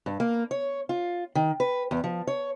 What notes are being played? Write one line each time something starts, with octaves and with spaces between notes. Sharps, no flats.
G2
A#3
C#5
F4
D#3
B4
E2
F3
C#5